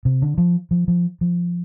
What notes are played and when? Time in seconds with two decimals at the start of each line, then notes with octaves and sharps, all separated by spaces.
0.05 C3
0.22 D3
0.38 F3
0.71 F3
0.88 F3
1.21 F3